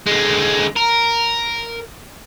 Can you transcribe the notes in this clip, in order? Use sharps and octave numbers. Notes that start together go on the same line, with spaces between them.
D3 G#3
A#4